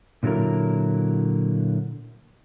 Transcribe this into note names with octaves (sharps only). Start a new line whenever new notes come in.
A#2 D3 F#3 E4 A#4